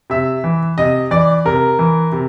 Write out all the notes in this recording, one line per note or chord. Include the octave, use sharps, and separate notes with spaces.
C3 E5
E3
C3 D#5
E3 D5
C3 A#4
E3
C3